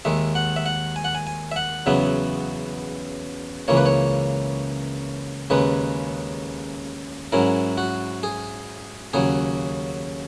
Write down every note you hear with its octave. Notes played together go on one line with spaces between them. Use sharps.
D#2 D#3 G#3 E5
F#5
E5
F#5
G#5
F#5
G#5
G#5
E5
F#5
E2 C#3 F#3 B3 E5
C#2 C#3 E3 A#3 C#5
B4
C#5
D#2 C#3 G#3 D#4 B4
G#2 F#3 C#4 E4 A#4
F#4
G#4
D#2 C#3 F#3 G#4